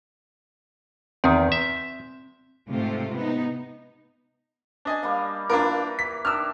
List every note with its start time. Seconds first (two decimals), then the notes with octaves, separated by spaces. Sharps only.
1.24 E2 D#3 C4
1.52 E5
2.70 G#2 C3 A3 F4
3.16 B3 D#4
4.85 D4 D#5 G#5
5.03 G3 A#3 F5
5.50 E3 A#3 D4 F4 A#4
5.99 B6
6.25 D#3 D4 E6 F6